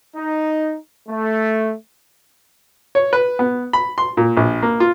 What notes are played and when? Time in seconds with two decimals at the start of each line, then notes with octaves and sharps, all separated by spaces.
0.16 D#4
1.08 A3
2.95 C#5
3.13 B4
3.39 B3
3.73 B5
3.98 C6
4.17 A#2
4.37 A#1
4.62 A#3
4.80 F4